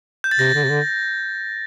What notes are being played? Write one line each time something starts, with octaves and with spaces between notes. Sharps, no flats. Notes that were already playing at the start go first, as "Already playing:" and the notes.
G6
A6
C3 A#6
D3
C3
D3